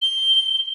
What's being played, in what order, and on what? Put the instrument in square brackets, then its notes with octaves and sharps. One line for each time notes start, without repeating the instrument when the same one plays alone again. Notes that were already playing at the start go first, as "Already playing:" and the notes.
[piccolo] G7